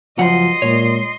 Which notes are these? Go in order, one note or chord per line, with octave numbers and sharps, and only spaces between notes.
C#2 F#2 F3 D#5 F#5 C6
A#2 G#3 C#5